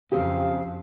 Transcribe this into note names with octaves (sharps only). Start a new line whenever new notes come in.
F2 C#3 C4 G4 F5